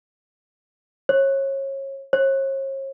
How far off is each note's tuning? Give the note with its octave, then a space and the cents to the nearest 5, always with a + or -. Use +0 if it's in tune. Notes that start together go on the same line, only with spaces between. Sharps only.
C#5 -30
C#5 -45